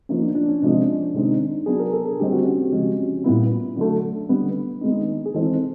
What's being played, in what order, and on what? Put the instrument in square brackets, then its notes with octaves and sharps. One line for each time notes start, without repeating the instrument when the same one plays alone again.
[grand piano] F3 A#3 D#4 [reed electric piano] C#4
[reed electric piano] D4
D4
C#4
[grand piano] C3 F3 G#3 [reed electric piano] D4
[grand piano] C3 D#3 G#3 C4 D#4
[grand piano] F#3 B3 D4 [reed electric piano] G#4
[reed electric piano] A#4
A4
G#4
[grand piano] D3 G3 C4 [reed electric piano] G4
[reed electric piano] F#4
C#4
C4
[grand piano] C#3 F3 G#3 [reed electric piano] C#4
[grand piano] A#2 G3 B3 E4
[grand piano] D3 F#3 A3 [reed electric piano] D4
[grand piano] D3 G3 B3
[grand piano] D#3 G#3 B3 [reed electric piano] D#4
[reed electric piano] G#4
[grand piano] E3 G#3 C4 [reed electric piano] A4